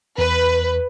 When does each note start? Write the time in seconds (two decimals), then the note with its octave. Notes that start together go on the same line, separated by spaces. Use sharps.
0.18 E2 B4